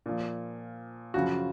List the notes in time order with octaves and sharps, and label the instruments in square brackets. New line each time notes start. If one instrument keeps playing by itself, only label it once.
[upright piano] A#2 F3
F#2 C#3 F3 F#4